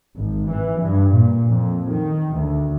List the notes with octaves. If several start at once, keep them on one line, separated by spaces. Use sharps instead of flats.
G#1
E3
G2
A#2
F2
D#3
D2